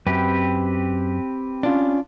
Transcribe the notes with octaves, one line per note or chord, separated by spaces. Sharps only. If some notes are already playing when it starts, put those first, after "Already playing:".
F#2 C4 G4 B4
C#4 D4 F4